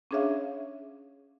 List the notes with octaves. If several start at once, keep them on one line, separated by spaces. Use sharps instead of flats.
C#4 D4 G#4 C#5 E5 F5